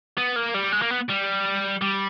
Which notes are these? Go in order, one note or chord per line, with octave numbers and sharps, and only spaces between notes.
B3
A#3
G3
G#3
A#3
B3
G3
G3